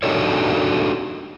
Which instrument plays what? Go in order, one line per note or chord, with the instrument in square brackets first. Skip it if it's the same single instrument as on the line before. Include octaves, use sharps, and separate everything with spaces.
[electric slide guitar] D4 D#4 F#4 G4 A4 C#5